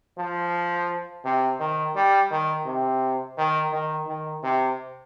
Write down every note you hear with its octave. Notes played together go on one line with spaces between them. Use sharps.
F3
C3
D#3
G3
D#3
C3
D#3
D#3
D#3
C3